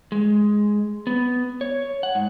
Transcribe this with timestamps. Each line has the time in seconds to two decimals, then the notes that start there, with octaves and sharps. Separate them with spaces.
0.12 G#3
1.07 B3
1.61 C#5
2.03 F#5
2.15 G#2